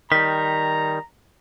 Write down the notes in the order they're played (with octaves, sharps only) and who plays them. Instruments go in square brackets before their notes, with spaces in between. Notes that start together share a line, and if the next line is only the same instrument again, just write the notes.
[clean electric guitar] D#3 G3 [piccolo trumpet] A#5 [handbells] B6